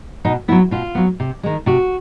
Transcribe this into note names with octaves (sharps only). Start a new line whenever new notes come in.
B2 D#4
F#3 B3 E4
B2 F4
F#3 B3
C3
D#3 G#3
C3 F#4